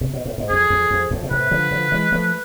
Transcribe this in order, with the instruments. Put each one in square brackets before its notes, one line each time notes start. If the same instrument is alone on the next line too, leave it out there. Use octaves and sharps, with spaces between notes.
[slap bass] C3
B2
A2
G#2
[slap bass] F2 [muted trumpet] G#4
[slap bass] F2
F2
F2 A2
B2
[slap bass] A2 C3 [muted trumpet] B4
[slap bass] D3 F3
D3 F3
E3 G#3
F3 A3